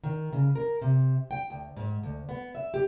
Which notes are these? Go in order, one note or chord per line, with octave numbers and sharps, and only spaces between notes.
D#3
C#3
A#4
C3
G5
D2
G#2
D2
B3
E5
G4